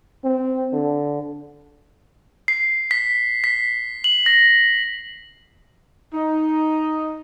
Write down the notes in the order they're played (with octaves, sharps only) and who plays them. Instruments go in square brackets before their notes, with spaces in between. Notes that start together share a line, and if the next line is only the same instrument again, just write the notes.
[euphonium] C4
D3
[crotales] C7
B6
B6
F#7
A#6
[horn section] D#4